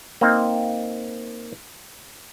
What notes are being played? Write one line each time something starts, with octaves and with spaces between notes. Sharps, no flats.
A#3 C4 D#4